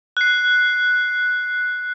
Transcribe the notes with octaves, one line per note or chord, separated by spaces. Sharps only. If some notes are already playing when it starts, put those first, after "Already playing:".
F#6 C7